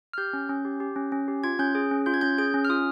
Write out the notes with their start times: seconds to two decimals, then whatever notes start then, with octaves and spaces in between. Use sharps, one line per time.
0.13 F6
0.18 G4 G6
0.33 C#4
0.49 C#4
0.65 G4
0.80 G4
0.96 C#4
1.12 C#4
1.28 G4
1.44 F4 G#6
1.59 C#4 G6
1.75 G#4
1.91 C#4
2.06 F4 G6
2.14 G#6
2.21 C#4 G6
2.38 G#4 G6
2.54 C#4
2.65 F6
2.69 F4 D#6